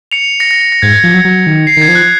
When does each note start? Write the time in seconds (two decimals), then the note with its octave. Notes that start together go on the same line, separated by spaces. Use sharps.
0.12 C#7 F7
0.40 A#6 C#7
0.51 A#6
0.61 A#6
0.72 A#6
0.82 G#2 G#6
0.96 A#6
1.03 F3
1.11 F#3 A#6
1.25 F#3
1.47 D#3
1.67 C7
1.77 D#3 G#6
1.88 F3
1.95 F#6